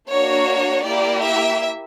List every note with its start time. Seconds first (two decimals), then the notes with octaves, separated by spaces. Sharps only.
0.10 A#3 D4 F#4 C#5
0.85 A#3 E4 G4 D5
1.23 E5